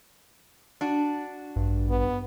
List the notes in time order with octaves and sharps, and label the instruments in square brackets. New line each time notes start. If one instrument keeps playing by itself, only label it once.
[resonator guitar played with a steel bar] D4 F#4
[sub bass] A1 [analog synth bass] G2
[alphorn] B3